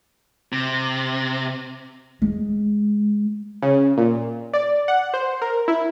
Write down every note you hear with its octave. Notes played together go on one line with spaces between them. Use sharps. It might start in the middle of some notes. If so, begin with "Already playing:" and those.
C3
G#3
C#3
A#2
D5
F#5
C5
A#4
E4